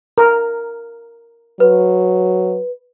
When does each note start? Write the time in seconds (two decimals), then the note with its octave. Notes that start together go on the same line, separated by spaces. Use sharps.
0.18 A#4
1.60 F#3 B4